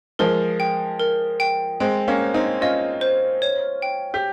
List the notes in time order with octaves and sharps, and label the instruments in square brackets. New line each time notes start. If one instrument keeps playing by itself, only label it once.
[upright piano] F3 G#3 [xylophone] A#4
[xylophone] G5
A#4
G5
[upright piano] G#3 C4 [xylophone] G5
[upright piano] A#3 C#4
[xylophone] C5
[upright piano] C4 D#4
[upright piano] C#4 F4 [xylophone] D#5
[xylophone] C5
C#5
G5
[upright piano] G4